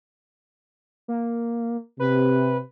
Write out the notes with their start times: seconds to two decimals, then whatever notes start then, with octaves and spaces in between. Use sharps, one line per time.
1.08 A#3
1.99 C3 B4